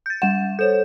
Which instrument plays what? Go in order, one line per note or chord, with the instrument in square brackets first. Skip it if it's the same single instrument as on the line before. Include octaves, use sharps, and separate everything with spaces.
[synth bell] G6 A6
[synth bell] G3 F#5 [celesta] E7
[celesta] A4 C5 C#5 [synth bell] G6 E7